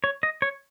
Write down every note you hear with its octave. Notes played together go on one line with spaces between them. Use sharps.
C#5
D#5
C#5